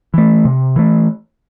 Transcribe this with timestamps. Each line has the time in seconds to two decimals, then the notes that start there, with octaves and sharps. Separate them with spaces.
0.14 E3 A3
0.45 C3
0.76 E3 A3